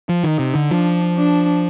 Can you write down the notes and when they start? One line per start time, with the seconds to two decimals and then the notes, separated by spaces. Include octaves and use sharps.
0.09 F3
0.24 D#3 D#4
0.39 C3
0.55 D3
0.70 F3 D4
1.17 D4